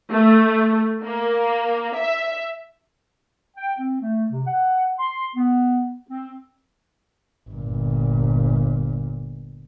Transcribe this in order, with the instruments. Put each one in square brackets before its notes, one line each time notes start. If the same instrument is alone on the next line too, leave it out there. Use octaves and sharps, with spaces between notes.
[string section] A3
A#3
E5
[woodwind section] G5
C4
A3
C3
F#5
C6
B3
C4
[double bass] G1 A#2